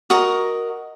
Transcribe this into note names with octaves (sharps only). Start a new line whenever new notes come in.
F#4 A#4 D#5